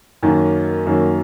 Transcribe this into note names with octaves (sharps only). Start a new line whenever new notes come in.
F#2 D#3 F#3 A#3
F#2 D#3 F#3 A#3